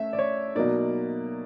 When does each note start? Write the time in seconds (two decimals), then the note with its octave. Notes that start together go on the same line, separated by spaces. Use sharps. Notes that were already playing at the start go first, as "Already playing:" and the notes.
Already playing: A3 C#4 E5
0.13 D5
0.19 C#5
0.55 B2 F#3 A#3 D#4 D5